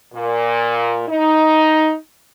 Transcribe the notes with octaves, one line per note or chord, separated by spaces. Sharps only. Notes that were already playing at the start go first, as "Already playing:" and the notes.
A#2
D#4